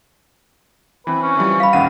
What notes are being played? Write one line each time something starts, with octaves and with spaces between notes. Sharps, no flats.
E3 C4 B4
C#4
E3 F3 G3
F5 B5
A1 D#2 C#4 F#5 D#7